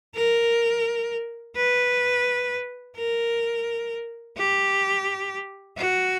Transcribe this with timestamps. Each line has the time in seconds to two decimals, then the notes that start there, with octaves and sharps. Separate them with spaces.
0.15 A#4
1.56 B4
2.96 A#4
4.37 G4
5.77 F#4